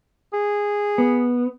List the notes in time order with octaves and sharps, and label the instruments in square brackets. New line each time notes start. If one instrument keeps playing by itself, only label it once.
[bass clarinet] G#4
[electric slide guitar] B3